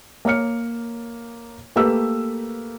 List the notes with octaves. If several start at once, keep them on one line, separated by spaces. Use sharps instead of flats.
A#3 C#5 F6 C#7
A3 A#3 G4 B4 E6